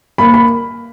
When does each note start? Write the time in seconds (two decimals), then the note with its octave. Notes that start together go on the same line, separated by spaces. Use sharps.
0.18 A#3 B5
0.34 B5